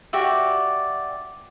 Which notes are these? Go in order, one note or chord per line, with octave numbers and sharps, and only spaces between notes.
F#4 G4 D5 E5